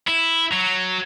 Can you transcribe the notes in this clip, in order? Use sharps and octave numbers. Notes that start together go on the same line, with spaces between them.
E4
F#3